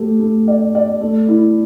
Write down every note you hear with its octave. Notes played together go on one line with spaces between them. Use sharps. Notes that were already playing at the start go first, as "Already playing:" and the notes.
Already playing: A3 G4
A3
D5
D5
A3
E4